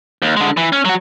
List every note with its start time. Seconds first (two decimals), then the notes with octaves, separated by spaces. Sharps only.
0.22 D#2
0.37 D3 G#3
0.57 E3
0.72 C#4
0.85 F#3 F#4